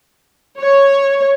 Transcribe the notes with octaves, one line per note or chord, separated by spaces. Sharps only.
C#5